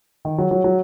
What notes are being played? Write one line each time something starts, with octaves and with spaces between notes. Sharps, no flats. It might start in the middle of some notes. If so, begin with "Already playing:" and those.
D#3
F#3
F#3
F#3